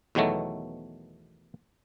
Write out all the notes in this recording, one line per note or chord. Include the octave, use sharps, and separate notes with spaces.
E2 B2 D#3 F#3 A3